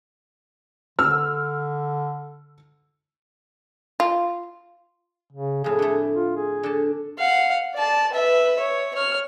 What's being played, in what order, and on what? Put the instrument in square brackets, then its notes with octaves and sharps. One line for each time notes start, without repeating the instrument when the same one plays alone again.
[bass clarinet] D3 [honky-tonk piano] E6 F6
[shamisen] F4
[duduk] C#3
[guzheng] F2 A2 [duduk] G#4
[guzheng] D3 A3
[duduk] F4
G#4
[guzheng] D3 A5
[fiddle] F5 F#5
D5 A5
B4 E5
C#5
C#5 F6